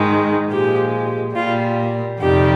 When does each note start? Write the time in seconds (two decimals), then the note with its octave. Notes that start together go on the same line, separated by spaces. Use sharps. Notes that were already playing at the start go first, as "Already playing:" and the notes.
Already playing: G#2 D#3 G#3
0.50 A#2 F3 G#3 G4
1.34 A#2 G3 F4
2.20 F2 C3 D#3 G3 G4